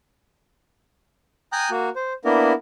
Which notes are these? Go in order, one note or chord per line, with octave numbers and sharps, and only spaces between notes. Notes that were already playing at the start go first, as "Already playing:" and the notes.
G5 G#5 A#5 D#6 F#6 G6
A#3 F#4
C5
A#3 B3 D4 E4 A#4